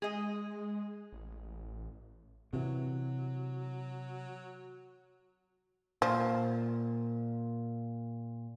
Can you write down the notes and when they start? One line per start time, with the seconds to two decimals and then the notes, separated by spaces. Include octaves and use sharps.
0.02 G#3 G#4 D#5
1.13 A1
2.53 C3 E3 F#3
6.02 A#2 F3